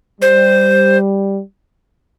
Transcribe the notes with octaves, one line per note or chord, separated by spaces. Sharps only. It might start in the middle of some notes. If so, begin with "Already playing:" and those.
G3 C5